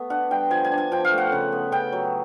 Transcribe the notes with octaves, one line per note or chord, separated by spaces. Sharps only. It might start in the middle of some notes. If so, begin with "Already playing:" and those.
Already playing: A3 B3
D4 F#5
G3 G5
F3 G#5
G#5
D4
G#5
F3 G5
F5
A3
F#5
C#3
B3
C#3 G5
F#3